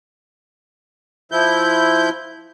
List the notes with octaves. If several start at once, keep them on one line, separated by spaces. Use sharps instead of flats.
F3 E4 G6